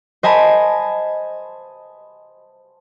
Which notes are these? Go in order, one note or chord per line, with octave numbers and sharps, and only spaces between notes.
C5 D#5 G#5 A5 B5